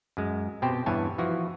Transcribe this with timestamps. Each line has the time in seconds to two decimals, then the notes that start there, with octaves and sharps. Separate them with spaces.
0.17 F#2 G#3
0.62 B2 C4 G4 C5
0.86 E2 G2 E3 C#5 G#5 A5
1.18 E3 F3 F#4